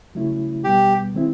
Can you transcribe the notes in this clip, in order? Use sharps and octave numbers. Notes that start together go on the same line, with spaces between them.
C#3 F#3 A3 C#4 E4
B2 G3 B3 G4
D#3 G#3 C4 E4